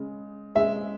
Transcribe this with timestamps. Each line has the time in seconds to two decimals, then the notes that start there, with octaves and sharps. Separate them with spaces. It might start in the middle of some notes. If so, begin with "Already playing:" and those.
Already playing: C#3 G#3
0.55 C#3 G#3 E5